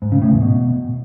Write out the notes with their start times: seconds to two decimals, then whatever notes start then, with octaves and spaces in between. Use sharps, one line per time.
0.02 G#2
0.12 C#3
0.22 A2
0.32 E2
0.42 B2